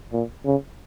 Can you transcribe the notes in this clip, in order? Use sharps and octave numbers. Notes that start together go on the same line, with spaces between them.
A#2
C#3